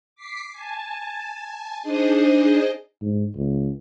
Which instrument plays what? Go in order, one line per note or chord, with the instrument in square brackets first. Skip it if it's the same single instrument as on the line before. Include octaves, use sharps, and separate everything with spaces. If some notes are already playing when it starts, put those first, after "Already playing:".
[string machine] D6 B6 C7
G#5 A5
D4 D#4 G#4 C5 D#5
[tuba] G#2
C#2